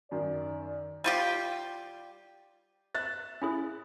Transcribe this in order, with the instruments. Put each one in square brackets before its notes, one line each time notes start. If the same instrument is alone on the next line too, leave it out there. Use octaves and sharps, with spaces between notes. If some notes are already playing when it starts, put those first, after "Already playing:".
[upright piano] F#2 D#3 [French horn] D5
[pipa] G3 F4 G4
[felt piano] E5 F#6 A6
[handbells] C#4 E4 G#4